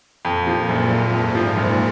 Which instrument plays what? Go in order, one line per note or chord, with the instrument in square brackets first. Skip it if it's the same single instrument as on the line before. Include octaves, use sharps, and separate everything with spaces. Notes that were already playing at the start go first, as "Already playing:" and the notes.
[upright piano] F2 [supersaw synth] A#2
[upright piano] F3
F#1
F#1
[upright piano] F2 [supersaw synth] G#2
[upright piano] F3
[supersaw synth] A#2
[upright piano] F#1